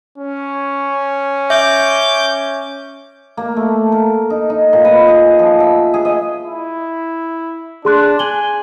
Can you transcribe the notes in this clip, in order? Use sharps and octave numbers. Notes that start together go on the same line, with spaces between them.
C#4
E5 D6 G6
A#3
A3
A#4
D#4
D#4
A#2
B4
G#4
F3
E5
G#4
D#5
E4
D4 G#4 C6 F#6
G#5 F#7 G7